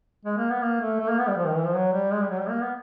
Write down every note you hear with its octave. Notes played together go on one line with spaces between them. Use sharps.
G#3
A#3
B3
A#3
A3
A3
A#3
B3
G3
F3
D#3
E3
F3
F#3
G3
G#3
G3
F#3
G3
A#3
B3